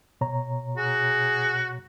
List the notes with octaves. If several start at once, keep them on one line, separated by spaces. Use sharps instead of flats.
B2 C#5 A#5
F#4 G#4